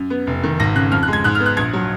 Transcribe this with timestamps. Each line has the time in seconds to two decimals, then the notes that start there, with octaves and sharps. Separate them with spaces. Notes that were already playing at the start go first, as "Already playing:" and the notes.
Already playing: F#2
0.10 B3
0.27 F1
0.43 D#3
0.60 G#1 A#6
0.75 C#3 F#6
0.91 F2 F6
1.03 F#6
1.08 G#3
1.13 G#6
1.24 G#2 F#6
1.35 F6
1.40 B3
1.46 F#6
1.57 A#1 G#6
1.73 F#3